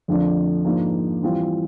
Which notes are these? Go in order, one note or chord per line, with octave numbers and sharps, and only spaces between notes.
F2 D3 F3 A3 D4
G#2 F3 A#3 D4
E3 G3 C4 F4